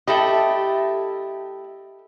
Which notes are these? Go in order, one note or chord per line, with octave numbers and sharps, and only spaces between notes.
A3 E4 G4 A4 D#5